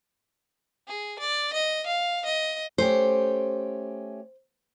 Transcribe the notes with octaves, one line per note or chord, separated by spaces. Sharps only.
G#4
D5
D#5
F5
D#5
A3 C#4 G4 C5